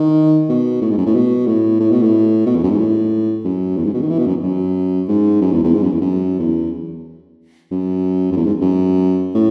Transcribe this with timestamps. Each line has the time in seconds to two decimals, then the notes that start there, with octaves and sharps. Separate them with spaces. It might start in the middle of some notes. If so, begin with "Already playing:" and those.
Already playing: D#3
0.49 B2
0.82 A2
0.90 G#2
0.98 F#2
1.06 A2
1.15 B2
1.47 A2
1.80 A2
1.91 B2
2.02 A2
2.46 B2
2.56 E2
2.63 F#2
2.71 G#2
2.79 A2
3.44 F#2
3.77 E2
3.85 G#2
3.94 B2
4.02 D#3
4.10 E3
4.19 B2
4.27 F#2
4.43 F#2
5.08 G#2
5.41 F#2
5.52 E2
5.63 E2
5.74 G#2
5.83 F#2
5.92 E2
6.01 F#2
6.39 E2
7.71 F#2
8.32 F#2
8.37 E2
8.45 G#2
8.62 F#2
9.35 A2